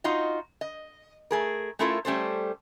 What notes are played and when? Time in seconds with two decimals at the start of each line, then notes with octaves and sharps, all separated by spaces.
0.04 D#4 F4 F#4 D#5
0.61 D#5
1.31 A3 G#4 A#4
1.79 A3 C#4 E4 F4 A4 A#4
2.05 G3 A3 C#4 A4 C5